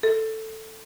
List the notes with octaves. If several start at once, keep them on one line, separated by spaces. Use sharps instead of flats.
A4